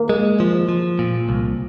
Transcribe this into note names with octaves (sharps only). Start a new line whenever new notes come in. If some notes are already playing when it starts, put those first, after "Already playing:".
Already playing: A#3
G#3
F3
F3
A#2
C2